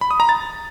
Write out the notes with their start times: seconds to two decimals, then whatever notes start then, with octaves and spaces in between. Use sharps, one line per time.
0.01 B5
0.11 D#6
0.20 A#5
0.29 A6